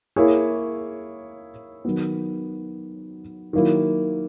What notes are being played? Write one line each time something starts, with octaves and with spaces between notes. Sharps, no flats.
A#3 E4 G#4 C#5
D#3 F#3 B3
D#3 F#3 A#3 E4